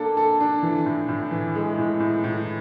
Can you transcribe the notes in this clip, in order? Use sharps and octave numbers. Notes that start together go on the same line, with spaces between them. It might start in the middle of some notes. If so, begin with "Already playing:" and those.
Already playing: A#3 D4 A4
A4
D4
E3
A2
A2
E3
G#3
A2
A2
A2